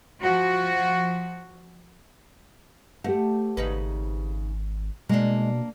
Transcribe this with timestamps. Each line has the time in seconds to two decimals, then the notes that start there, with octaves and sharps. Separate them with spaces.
0.21 F3 F#4
3.04 A3 G4 C5 F#5
3.57 G#1 C#3 D#4 B4
5.09 B2 G#3 A#3 D4